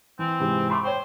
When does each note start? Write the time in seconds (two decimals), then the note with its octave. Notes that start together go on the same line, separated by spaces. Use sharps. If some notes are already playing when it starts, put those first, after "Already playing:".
0.19 E3 C4
0.40 G#2 C3 E3
0.70 A3 B5 C6 D6
0.83 C5 C#5 G5 C#6